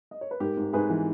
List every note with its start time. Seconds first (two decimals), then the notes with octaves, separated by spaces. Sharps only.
0.11 D#5
0.21 C#5
0.31 B4
0.40 G#2 G4 A#4
0.57 G#2
0.73 G#2 G#4 B4
0.90 E3